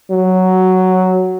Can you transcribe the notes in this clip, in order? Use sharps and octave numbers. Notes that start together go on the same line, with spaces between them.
F#3